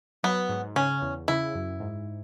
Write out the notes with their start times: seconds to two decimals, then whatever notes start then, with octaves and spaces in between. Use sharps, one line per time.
0.23 F#3 B3
0.49 G#2
0.76 C#3 C#4
1.02 E2
1.28 C#3 E4
1.55 F#2
1.80 G#2